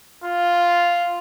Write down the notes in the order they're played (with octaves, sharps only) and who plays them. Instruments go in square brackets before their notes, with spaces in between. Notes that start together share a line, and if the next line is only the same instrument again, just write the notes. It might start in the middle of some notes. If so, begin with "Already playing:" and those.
[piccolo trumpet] F4